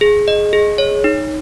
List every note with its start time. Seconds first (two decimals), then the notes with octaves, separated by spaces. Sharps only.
0.01 G#4
0.28 D#5
0.53 G#4
0.78 C#5
1.04 D#4